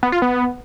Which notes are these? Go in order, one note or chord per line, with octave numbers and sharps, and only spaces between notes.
B3
F4
B3